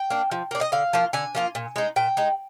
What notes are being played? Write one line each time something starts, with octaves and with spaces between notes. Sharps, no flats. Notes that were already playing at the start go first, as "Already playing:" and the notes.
Already playing: G5
A#3 D4
F3
A#3 D4
D#5
D3 F5
F3 A#3 F4
D3 G#5
F3 A#3 F4
A#2
G#3 D#4
A#2 G5
G#3 D#4